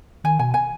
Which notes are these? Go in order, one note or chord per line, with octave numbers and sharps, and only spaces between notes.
D#3 G#5
B2 G#5
G#5